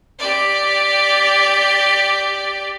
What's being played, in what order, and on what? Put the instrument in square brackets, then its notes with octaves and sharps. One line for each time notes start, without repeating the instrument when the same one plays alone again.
[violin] G4 D5